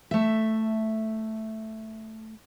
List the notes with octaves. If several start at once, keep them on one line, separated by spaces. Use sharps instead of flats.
A3 E5